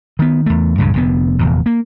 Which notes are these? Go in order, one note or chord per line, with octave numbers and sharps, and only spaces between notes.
D#3 B3
E2 A3
C#2 G2 A#2 C#3
F1 D3 B3
F1 E2 A#2
A#3